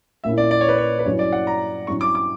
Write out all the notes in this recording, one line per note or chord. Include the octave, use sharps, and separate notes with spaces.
A#2 A#3 C#4 E4 E5
D5
D5
C#5
B4
C#5
B4
G2 F#3 C#4 E4 C#5
D5
F#5
A#5
G2 F#3 C#4 E4 C#6
D6
D6